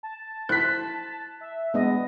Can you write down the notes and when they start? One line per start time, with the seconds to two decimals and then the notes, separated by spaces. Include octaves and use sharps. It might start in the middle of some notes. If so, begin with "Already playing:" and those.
0.03 A5
0.49 E4 C5 F#6 B6
1.41 E5
1.74 G#3 B3 D4 D#5